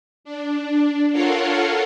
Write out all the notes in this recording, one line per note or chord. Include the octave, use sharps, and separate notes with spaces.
D4
F4 A4 A#4 C#5 F5 F#5